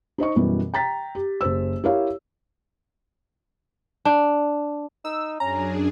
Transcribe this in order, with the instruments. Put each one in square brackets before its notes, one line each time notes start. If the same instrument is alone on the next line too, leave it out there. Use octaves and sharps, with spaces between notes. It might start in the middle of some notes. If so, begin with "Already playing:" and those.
[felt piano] D#4 C5 D#5 C#6
F#2 B2 E3 G3
G5 A#5 A6 B6
G4
F#1 G4 C5 E6
E4 G4 A#4 C#5 F5
[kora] D4
[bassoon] D#4 [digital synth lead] E6
[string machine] F#2 D4 G#4 [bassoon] C#4 [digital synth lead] A#5